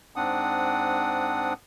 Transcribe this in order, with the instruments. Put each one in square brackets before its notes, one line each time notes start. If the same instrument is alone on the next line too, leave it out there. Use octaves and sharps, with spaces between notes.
[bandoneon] G#2 C4 D4 F#5 D#6